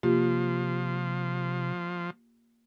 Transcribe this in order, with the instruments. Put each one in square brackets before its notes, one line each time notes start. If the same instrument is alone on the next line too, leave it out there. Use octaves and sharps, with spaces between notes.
[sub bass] C3 [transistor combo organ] F3 [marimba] A#3 F4 G4